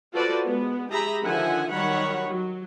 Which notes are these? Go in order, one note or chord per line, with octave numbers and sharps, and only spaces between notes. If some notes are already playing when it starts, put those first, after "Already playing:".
F4 F#4 A4 B4 C5 D5
G#3 B3
G4 G#4 E5 A#5 B5
D3 D#3 F3 E5 F#5 G#5
D#3 F#3 G3 C#5 F#5 B5
F#3